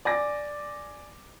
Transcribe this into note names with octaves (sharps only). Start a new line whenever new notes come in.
D5 G#5 D6 A#6